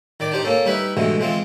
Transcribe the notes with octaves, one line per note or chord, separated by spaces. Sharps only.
D#3 D5 D6
D4 D#4 G4 C5
A#3 C#4 A4
G3 D#4 E4 B4 E5
G2 B2 D3 E3 G#3 A3
E3 G#3 C4 F4